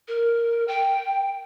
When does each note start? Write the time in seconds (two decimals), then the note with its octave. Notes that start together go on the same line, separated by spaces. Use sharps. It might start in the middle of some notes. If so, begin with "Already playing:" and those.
0.08 A#4
0.68 G5